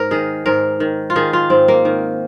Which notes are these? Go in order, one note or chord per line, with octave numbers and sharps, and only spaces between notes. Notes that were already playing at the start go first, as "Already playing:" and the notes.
Already playing: G#2 A#4
D#3 G#4
G#2 A#4
D#3
F4
D#3 G#4
F4
G#2 C4
A#3
D#3